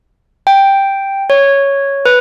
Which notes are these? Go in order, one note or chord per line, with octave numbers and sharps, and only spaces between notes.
G5
C#5
B4